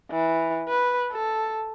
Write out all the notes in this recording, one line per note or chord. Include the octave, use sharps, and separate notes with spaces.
E3
B4
A4